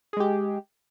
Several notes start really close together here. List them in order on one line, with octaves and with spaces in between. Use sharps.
G#4 G#3 G4